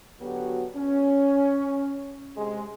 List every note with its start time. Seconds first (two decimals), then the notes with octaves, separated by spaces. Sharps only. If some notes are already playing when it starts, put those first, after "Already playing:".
0.20 D3 F#3 B3 F#4 G4
0.76 C#4
2.36 C3 G#3